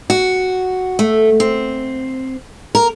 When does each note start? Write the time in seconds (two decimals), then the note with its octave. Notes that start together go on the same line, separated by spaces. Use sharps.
0.10 F#4
0.99 A3
1.40 C4
2.75 A#4